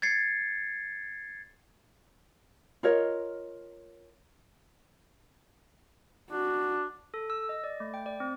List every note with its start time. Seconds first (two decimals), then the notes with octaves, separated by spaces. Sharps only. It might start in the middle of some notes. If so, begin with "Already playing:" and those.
0.02 G#6 A6 C7 C#7
2.83 F4 A#4 C#5 D#5
6.31 D4 F#4
7.14 A4
7.30 E6
7.49 D#5
7.64 D5
7.80 A3
7.94 G5
8.06 D5
8.20 C4